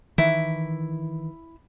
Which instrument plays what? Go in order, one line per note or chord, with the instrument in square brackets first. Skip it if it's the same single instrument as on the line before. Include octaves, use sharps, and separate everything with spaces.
[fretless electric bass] D#3 E3 [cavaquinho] E4